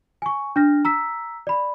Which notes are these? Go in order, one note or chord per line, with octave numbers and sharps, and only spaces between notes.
G#5 C#6
D4 F6 A#6
A#5 E6 B6
D5 B5